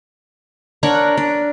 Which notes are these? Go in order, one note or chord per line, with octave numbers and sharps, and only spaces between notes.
D4 A#4 C#5 F#5
D4